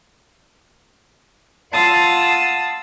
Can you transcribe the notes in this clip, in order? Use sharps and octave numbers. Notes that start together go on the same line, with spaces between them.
F4 F5 F#5 A5 D#6 E6